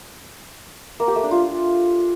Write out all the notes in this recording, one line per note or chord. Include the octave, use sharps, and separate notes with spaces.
A#3
G4
A3
D4
F4